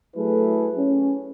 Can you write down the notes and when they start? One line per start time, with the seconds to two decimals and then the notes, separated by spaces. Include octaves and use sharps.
0.16 F#3 A3 E4 G#4 A4 B4
0.77 C#4